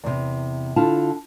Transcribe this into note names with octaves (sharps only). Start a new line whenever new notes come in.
E2 C3
D3 E4 F4 A5